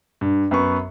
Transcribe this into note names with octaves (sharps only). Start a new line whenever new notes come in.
G2
F#2 B3 B4 C#6